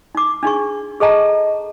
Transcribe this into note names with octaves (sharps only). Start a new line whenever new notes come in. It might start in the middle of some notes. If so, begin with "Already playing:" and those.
D#4 D6
D4 D#4 G#4 C#6
G#4 A4 D#5 A5 A#5